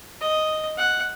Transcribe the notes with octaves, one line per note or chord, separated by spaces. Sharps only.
D#5
F#5